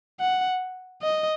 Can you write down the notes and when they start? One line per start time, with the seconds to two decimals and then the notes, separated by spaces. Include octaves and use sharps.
0.21 F#5
1.02 D#5